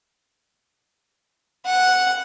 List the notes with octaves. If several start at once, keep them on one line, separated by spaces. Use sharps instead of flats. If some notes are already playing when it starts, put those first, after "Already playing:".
F#5